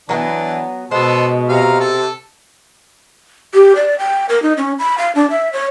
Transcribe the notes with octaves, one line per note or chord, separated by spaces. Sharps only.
E3 F#3 A#3 B3 D4
B2 G#3 B3 A4 C5
C3 F5 A#5
A4 A5
G4
D5
G5
A#4
D#4
C#4
B5
F5
D4
E5
C#5